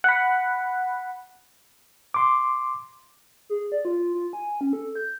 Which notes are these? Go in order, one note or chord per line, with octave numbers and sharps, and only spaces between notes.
F#5 B5
C6 D6
G#4
D5
F4
F4
G#5
C#4
A4
G6